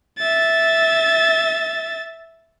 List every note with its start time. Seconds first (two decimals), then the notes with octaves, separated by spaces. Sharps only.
0.18 E5 A6